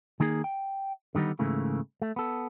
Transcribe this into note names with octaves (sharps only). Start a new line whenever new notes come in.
D#3 A#3 D#4 G#4
G5
D3 D#3 G3 B3 D#4
G#2 C#3 E3 A3 A#3
A3
B3 A4